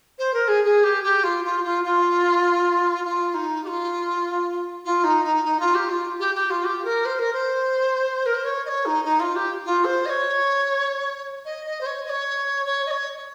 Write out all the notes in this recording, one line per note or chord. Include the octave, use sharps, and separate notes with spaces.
C5
A#4
G#4
G#4
G4
G4
F4
F4
F4
F4
F4
D#4
G4
F4
F4
D#4
D#4
D#4
F4
G4
F4
G4
G4
F4
G4
A#4
C5
A#4
C5
A#4
C5
C#5
D#5
C#5
D#4
D#4
F4
G4
F4
C5
D#5
C#5
D#5
D#5
C5
C#5
D#5
C#5
C#5
D#5
C#5